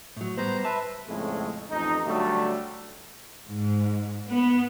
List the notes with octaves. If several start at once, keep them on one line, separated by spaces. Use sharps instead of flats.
A2 F#3
G3 B3 C5 A#5
B4 E5 A5
F2 A2 C#3 G#3 A3
A1 F2 D#4
D3 F#3 G3 A3
G#2
B3